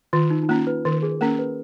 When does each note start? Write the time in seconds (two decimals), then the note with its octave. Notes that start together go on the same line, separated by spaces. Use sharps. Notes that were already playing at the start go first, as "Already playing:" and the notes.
0.13 D#3 F4
0.30 D#4
0.43 D#4
0.48 A#3 C#4 F4
0.67 B4
0.85 D#3 A#4
1.03 G#4
1.21 A#3 C#4 A#4
1.39 B4